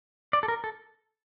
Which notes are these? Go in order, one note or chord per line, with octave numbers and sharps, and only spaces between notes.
D5
A4
A#4
A4